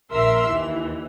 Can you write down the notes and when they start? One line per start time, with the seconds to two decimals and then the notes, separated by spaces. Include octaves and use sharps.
0.12 A#1 A#4 E5 C6 E6
0.49 D#2 E3